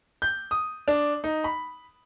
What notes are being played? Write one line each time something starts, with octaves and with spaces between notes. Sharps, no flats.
G6
D#6
D4
D#4
B5